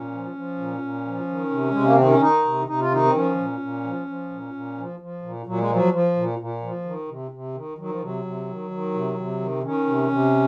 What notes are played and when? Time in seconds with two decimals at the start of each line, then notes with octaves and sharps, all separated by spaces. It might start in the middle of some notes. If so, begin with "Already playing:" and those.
Already playing: A#2 C#4
0.12 F3
0.35 F3
0.58 A#2
0.82 A#2
1.05 F3
1.29 D#3
1.51 C3
1.71 C3 G#3
1.83 A#3
1.96 D#3 C4
2.09 C#4
2.21 D#3 D#4
2.45 C3
2.67 C3 D#4
2.80 F4
2.91 D#3 D#4
3.05 C4
3.14 F3 C#4
3.38 A#2
3.60 A#2
3.83 F3
4.07 F3
4.30 A#2
4.53 A#2
4.77 F3
5.00 F3
5.22 A#2
5.46 A#2 F#3
5.59 G#3
5.69 F3 F#3
5.92 F3
6.16 A#2
6.39 A#2
6.62 F3
6.85 D#3
7.08 C3
7.31 C3
7.54 D#3
7.78 D#3 F#3
7.89 F3
8.01 C3 F#3
8.25 C3
8.48 D#3
8.70 D#3
8.94 C3
9.17 C3
9.40 D#3
9.63 D#3 C#4
9.87 C3
10.10 C3